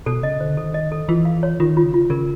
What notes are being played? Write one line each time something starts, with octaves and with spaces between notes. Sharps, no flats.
B2 A4
C#3 D#5
D3 C5
D#3 A4
D#5
A4
E3 F4
F5
C#5
D#3 F4
F4
C#3
F4
C#3 A#4